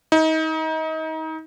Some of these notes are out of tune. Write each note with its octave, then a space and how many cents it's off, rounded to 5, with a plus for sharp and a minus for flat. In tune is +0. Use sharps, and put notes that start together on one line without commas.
D#4 +30